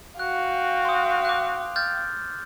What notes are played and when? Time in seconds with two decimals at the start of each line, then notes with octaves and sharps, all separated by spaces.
0.19 F#4 F5 G5 F#6
0.85 C6 D#6
1.25 D6 F#6
1.76 F6 G6 A6